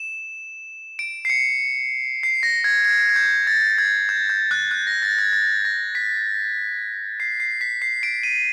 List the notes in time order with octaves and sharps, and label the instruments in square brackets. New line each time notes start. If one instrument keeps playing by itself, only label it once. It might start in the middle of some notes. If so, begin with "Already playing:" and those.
Already playing: [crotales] E7
D7
C7
C#7
C7
A#6
G#6
G#6
G#6
G6
A6
G#6
G6
G6
F#6
F#6
A#6
A6
G#6
A6
A#6
B6
C7
C7
B6
C7
D7
D#7